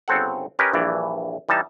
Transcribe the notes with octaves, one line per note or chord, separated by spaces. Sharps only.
G1 C#3 C4 A4 F#5
C#4 G4 A#4 B4 D#5
A#1 G2 E3 D5
E3 G3 D#4 A5